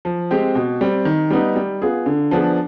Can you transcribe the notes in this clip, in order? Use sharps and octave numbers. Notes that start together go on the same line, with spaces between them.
F3
G#3 C4 G4
B2
G3 C4
D#3
G3 B3 D#4
G3
B3 F4 G#4
D3
F3 B3 D4 G#4